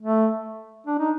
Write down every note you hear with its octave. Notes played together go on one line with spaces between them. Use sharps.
A3
D4
D#4